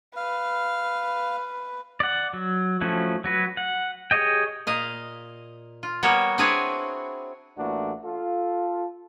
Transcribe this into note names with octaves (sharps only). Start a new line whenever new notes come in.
B4 F5
D5 F#5
F#3
F3 A3 C#4 E4 F#4
F#3 F#4 B4
F#5
G4 G#4 C#5 D#5 G5
A#2 D#5 F5
F4
G3 A#3 B3 F#4 C#5
C4 D4 E4 G#4 B4 C#5
A1 E3 A3 A#3 D4 F#4
F4 A4